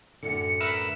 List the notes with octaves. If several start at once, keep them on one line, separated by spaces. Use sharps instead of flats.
F#2 A2 D3 C#7
A#4 B4 E5